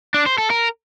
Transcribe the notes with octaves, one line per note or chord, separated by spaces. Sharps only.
D4
C5
A4
A#4